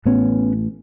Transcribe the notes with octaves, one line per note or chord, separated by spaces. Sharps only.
A1 A2 B3 C#4